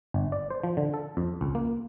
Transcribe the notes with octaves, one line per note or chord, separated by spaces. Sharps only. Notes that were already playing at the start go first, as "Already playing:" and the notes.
G1
D5
C5
F3
D3
A4
F2
C#2
A#3